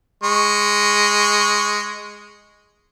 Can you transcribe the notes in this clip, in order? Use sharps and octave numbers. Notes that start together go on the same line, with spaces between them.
G#3 C#6